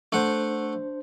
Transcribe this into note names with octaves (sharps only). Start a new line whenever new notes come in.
A3 D4 C5 F#5